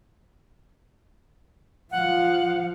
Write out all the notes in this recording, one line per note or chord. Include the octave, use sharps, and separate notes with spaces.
F3 F5 F#5